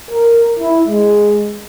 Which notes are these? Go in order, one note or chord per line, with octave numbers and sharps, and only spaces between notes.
A#4
E4
G#3